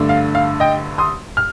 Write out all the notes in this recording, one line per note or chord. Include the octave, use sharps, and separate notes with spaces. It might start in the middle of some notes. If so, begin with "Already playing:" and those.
Already playing: G2 D3 A3 D4
F5
F5
D#5 G5
C6 D#6
F6